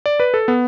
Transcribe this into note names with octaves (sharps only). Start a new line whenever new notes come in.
D5
B4
A4
B3